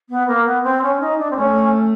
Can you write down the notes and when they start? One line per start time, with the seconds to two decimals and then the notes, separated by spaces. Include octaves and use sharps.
0.09 B3
0.27 A#3
0.45 B3
0.63 C4
0.82 C#4
1.00 D#4
1.18 D4
1.31 C4
1.36 A3 C#4